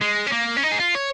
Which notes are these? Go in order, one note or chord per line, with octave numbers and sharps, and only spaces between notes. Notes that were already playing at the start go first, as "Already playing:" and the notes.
G#3
C#4
A#3
C#4
D#4
G#4
F4
C#5